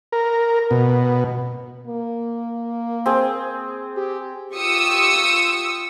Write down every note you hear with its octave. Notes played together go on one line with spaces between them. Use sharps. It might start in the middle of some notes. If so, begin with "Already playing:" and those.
A#4
B2
A#3
C4 G#4
G4
F4 G4 C#6 D#6 E6 C#7